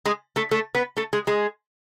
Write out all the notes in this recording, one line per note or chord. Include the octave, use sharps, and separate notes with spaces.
G#3 G#4
A3 A4
A3 A4
B3 B4
A3 A4
G#3 G#4
G#3 G#4